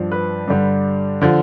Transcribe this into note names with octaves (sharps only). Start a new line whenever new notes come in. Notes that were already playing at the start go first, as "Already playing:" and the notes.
Already playing: G2 F3
B4
G2 D3 G3
D3 F3